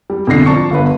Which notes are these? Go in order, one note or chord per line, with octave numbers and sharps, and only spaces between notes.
G3
F2 B2 D3 A#6 C7
F3 D5 A5 C#6 C#7
G1 B3 B4